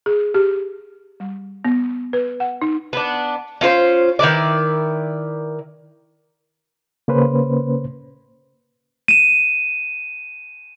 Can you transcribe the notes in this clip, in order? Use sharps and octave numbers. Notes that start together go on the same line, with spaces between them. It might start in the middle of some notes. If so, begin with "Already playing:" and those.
G#4
G4
G3
B3
B4
F#5
D#4
B3 D4
C#4 F4 B4 C5
D#3 E4 B4 D5
C#3 A#3 C#4 B4 C5
D#7 E7